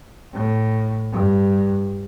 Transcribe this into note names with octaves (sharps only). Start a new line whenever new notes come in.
A2
G2